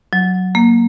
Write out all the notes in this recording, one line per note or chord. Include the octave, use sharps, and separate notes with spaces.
F#3
A#3